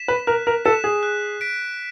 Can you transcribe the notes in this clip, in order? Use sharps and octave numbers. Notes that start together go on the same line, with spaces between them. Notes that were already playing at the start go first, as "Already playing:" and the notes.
Already playing: B6 E7
B4
A#4 F#6
A#4
A4 B6 E7
G#4
F#6
B6 D7